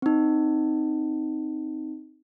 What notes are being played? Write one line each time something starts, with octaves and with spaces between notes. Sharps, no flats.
C4 D#4